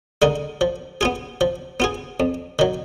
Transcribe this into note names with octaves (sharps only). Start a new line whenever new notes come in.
D3 G#3 D#4 A#4
F3
B3 F4 G#4
F3
B3 F4 G#4
F2
D#3 F#3